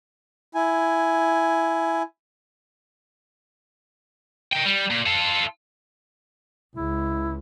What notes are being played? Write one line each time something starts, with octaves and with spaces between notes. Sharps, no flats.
E4 G#5
A#4 G5
G3
A#2
F4 A4
C#2 E4